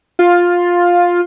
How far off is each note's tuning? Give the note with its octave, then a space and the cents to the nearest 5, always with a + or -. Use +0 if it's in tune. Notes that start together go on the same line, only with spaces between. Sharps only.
F4 +10